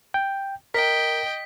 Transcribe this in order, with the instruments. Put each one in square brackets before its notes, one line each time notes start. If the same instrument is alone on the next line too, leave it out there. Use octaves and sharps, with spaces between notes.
[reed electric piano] G5
[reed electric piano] A#4 [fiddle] D#5 G5 [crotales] B6